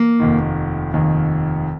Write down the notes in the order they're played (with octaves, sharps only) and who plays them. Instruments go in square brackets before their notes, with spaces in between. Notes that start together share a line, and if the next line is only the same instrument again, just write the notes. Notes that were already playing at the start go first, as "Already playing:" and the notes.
Already playing: [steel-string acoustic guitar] A#3
[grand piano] F1 D#2 D#3
F1 D#2 D#3